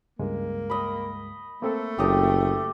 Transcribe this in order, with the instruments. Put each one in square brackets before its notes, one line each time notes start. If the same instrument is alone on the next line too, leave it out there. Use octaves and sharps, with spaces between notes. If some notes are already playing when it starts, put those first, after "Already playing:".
[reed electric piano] C#2 G2 G#3 [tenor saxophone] A#3
[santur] D#5 B5
[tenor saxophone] A3 [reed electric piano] A#3 C4 A4
[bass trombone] F#1 [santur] G4 D#5 A5